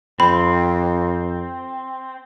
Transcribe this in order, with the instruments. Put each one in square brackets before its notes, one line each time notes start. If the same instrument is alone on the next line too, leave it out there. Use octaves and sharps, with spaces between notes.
[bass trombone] F2 [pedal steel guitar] C4 [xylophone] B5